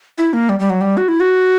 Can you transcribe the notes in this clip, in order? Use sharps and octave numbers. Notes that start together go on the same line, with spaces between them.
E4
A#3
G3
G3
F#3
G3
F#4
E4
F#4